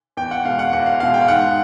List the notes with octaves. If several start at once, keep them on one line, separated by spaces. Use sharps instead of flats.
E2 G5
F#5
B2 G#3 F5
F#5
E2 F#5
F5
B2 G#3 F5
G5
F5
G#2 F#5